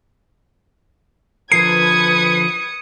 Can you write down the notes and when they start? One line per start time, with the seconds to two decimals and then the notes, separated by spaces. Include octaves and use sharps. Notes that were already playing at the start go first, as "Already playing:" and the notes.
1.52 D3 F3 A#4 B4 D#6 G#6 C7 C#7